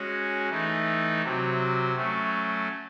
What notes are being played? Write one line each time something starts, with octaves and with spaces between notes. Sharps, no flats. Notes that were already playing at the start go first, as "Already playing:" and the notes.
Already playing: G#3 C#4 F#4
E3 A3 D#4
C3 F#3 C4
F#3 A3 C#4